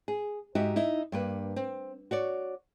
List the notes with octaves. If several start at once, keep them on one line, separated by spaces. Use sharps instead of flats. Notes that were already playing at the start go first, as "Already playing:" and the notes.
G#4
G#2 D#4 F#4 G4 E5
D#4 E4 E5
G2 A#3 B4
C4
F#4 C#5 D5